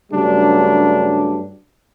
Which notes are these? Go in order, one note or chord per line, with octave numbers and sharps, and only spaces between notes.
G2 C#3 F#3 G3 A3 D4